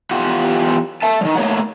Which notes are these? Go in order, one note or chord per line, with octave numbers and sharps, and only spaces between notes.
E2 F4 G4 F#5
E5 A5
D#3 G3
A3 A#3 C#5 F#5